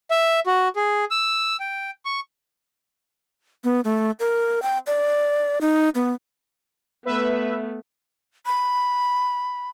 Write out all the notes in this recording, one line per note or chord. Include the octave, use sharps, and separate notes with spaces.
E5
F#4
G#4
E6
G5
C#6
B3
A3
A#4
G5
D5
D#4
B3
A3 B3 B4 E5
B5